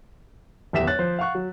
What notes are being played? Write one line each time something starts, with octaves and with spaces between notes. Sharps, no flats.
D1 E2 G4 E5 B6 E7
C#5 F#6 A6
F3 C5
F5 F#5 C#6 F#6
F#3